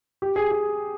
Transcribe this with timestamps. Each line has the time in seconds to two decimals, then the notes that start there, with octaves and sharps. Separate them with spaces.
0.22 G4
0.36 G#4
0.51 G#4